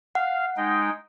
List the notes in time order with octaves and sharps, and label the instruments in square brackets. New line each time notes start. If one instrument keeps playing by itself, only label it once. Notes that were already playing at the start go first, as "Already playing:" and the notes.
[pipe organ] F5 [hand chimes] F#5
[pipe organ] G#3 D#4 G5